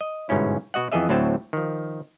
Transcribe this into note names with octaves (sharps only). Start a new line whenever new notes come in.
D#5
G1 G#2 B2 C#4 E4
B2 F#4 D#5 F#5
F2 E3 B3 G#4 D#5 E5
D2 A2 F#3 C4 A5
D#3 F3